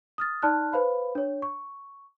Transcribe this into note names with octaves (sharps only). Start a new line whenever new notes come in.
D#6 F6 A6
D#4 D5 A5 C6 F6 F#6
B4 C5 F5 B5
D4 C#5
C#6